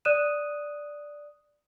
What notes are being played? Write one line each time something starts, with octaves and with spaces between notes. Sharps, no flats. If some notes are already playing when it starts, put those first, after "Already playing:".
D5 D#6 F#6 D#7 E7